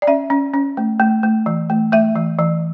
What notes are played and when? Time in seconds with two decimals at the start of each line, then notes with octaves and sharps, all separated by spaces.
0.02 D5
0.07 C#4 E5
0.30 C#4
0.54 C#4
0.77 A3
1.00 A3
1.23 A3
1.46 E3
1.70 A3
1.92 A3 E5
2.16 E3
2.39 E3